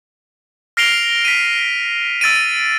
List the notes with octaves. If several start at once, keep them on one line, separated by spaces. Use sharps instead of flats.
F6 A#6 C7 D7 F7 G7
B6 D#7
E6 A6 D7 D#7